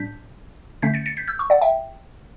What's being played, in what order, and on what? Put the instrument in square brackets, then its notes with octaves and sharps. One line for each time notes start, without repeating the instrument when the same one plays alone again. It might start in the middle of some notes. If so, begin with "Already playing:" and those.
Already playing: [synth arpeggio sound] A2 G3 D4 G6 B6
D3 A3 C#4 G6 B6
A6 C#7
A6 C#7
G6 B6
E6 G6
C#6 E6
D5 F#5
E5 G5